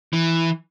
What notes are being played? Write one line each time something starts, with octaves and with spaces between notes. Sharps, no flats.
E3